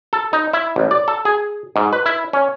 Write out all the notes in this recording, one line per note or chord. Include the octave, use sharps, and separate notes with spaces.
A4
D#4
E4
A1
D5
A4
G#4
G#2
B4
E4
C#4